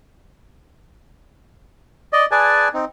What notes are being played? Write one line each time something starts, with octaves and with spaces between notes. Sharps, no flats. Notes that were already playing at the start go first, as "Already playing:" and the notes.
D5 D#5
G#4 B4 D5 G#5 A5
C4 D#4